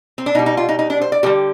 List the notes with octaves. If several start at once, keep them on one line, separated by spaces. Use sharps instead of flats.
C4
D4
B2 G3 D#4
D#4
F4
D#4
D#4
D4
C5
D5
D3 G3 G4